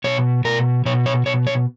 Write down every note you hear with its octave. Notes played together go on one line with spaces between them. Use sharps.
B2 C#5
B2 A#4
B2 C#5
C#5
B2 C#5
C#5